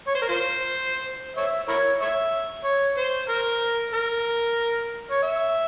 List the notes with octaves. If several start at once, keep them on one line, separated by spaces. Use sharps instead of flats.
C#5
C5
A#4
F4 C5
C#5 E5
E4 A#4 C#5
C#5 E5
C#5
C5
A#4
A#4
C#5
E5